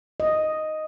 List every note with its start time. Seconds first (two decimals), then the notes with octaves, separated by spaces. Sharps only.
0.20 D#5